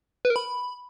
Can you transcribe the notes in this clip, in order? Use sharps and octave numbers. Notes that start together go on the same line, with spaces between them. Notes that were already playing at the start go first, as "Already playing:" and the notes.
B4
A#4
B5